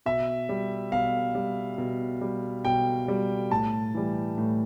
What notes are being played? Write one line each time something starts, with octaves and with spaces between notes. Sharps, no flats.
B2 E5
G3
B2 F5
G3
B2
G3
B2 G5
G3
A2 A5
E3 G3
A2